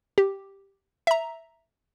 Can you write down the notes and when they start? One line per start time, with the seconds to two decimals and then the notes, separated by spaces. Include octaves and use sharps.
0.18 G4
1.07 E5 A#5